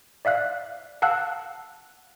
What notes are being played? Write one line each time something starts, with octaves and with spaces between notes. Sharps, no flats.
D5 E5 F5 F#6
F5 F#5 A5 E6 F#6